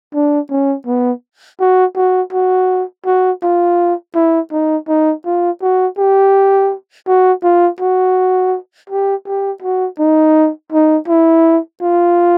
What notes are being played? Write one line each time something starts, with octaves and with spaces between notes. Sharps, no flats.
D4
C#4
B3
F#4
F#4
F#4
F#4
F4
E4
D#4
D#4
F4
F#4
G4
F#4
F4
F#4
G4
G4
F#4
D#4
D#4
E4
F4